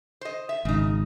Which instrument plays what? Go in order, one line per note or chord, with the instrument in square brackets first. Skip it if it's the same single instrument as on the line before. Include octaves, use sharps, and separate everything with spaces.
[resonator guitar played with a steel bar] C5 D#5
E5
[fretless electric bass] G#1 [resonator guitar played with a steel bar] C#3 D#4